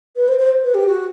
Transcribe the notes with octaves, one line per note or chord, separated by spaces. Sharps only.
B4
C5
C5
B4
G4
F#4